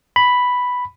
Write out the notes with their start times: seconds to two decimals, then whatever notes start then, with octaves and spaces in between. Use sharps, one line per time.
0.16 B5